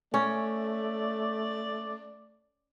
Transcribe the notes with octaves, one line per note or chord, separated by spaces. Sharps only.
A3 C#4 D5